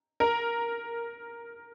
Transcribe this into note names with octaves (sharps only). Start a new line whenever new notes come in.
A#4